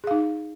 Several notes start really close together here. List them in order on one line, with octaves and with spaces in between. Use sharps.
G#4 F5 D#4